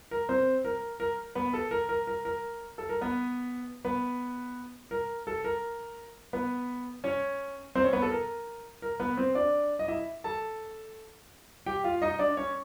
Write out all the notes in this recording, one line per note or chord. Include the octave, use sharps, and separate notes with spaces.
A#4
C4 C5
A#4
A#4
B3 B4
A4
A#4
A#4
A#4
A#4
A4
A#4
B3 B4
B3 B4
A#4
A4
A#4
B3 B4
C#4 C#5
C4 C5
C#4 C#5
B3 B4
A4
A#4
A#4
B3 B4
C4 C5
D4 D5
D#5
E4 E5
A4 A5
G4 G5
F4 F5
D#4 D#5
D4 D5
C#4 C#5